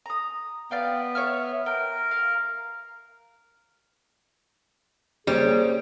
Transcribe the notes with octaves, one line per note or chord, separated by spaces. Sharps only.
A#5 D#6
B3 D5 F5 G5
C#5 E5 F6
A#4 G5
F5
G3 A#3 C#4 G#4 C5